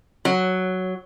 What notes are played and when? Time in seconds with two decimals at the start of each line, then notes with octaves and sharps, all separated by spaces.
0.25 F#3